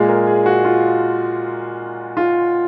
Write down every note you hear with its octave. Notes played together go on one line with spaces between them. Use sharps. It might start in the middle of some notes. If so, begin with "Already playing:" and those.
Already playing: A#2 G#3 G#4
A#4
G#4
F#4
F4
F4